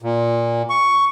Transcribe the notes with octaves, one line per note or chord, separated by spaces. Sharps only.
A#2
C#6